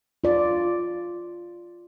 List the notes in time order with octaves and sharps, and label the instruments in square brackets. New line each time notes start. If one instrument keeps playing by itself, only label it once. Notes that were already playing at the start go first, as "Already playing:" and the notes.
[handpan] F4 D5